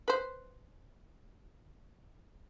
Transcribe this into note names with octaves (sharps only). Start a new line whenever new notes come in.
B4 C5